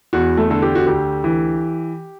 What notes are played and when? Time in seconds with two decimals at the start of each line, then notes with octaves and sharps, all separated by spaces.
0.13 E2 F#4
0.37 A3 A4
0.50 D3 A4
0.62 G4
0.75 F#4
0.87 D2 G4
1.24 E3